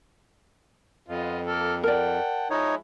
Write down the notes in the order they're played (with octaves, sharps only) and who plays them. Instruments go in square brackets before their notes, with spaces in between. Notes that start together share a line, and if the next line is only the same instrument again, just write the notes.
[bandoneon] F2 [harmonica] B3 F4 D#5
[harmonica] A#3 A4 F6
[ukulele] A#4 D5 [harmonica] F#5 G5 A5
[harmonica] F3 G#3 E4 [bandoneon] D#4 C#5